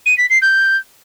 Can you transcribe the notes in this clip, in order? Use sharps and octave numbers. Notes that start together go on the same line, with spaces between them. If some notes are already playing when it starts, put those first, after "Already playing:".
D#7
B6
C7
G6